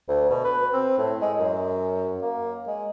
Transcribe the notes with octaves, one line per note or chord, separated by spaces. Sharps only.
D2
B2
B4
C4
A2
G#3
F#2
A#3
G#3